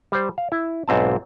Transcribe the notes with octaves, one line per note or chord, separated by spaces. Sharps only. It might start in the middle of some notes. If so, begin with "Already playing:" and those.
G3 C5
F5
E4
B1 G#2 C4 A5